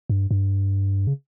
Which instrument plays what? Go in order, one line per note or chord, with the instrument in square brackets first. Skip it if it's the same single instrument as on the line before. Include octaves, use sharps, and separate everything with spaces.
[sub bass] G2
G2
C#3